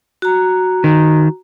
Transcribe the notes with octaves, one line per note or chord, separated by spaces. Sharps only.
F#4 A#5
D#3